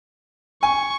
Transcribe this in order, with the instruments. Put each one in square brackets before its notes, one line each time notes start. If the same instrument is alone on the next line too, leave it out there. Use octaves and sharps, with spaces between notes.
[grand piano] G#5 [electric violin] C#6